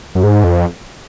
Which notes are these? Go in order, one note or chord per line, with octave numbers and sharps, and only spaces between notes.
F#2
G#2
F2